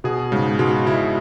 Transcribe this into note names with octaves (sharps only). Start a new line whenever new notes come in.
B2 G#4
G#2 C#3
B2 G#3
B2 E4